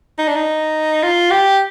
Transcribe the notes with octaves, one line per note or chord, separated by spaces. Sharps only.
D#4
D4
D#4
F4
G4